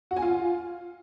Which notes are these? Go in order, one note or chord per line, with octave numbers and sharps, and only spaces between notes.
F#4
G#5
F4